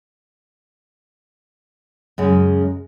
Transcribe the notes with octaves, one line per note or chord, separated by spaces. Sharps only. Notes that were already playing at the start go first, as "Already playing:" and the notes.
F#2 C#3 G#3